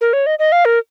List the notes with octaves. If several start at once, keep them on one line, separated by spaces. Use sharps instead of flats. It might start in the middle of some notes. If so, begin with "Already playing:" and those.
A#4
C#5
D#5
D#5
F5
A#4